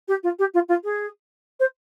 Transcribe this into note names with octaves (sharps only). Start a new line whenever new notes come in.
G4
F4
G4
F4
F4
G#4
C5